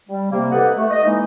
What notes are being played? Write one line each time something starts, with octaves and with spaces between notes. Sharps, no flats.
G3
C3 A#3
C2 G4 A4 B4 D#5 F#5
A3
D#5
E3 G#3 A#3 D#4